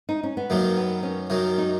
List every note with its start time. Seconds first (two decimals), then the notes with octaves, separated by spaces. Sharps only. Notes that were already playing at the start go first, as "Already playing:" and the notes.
0.09 D#4
0.23 C#4
0.37 B3
0.50 F#2 D#3 F#3 A#3
0.77 B3
1.03 C#4
1.30 F#2 D#3 F#3
1.58 D#4